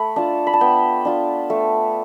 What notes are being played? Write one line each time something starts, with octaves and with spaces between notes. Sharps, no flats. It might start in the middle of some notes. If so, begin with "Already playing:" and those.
Already playing: A3 B5
D4 F4 A5
B5
A5
B3 G5
D4 F4
A3